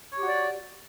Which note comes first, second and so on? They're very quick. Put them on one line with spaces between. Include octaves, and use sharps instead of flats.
C#5 G4 F#4 D5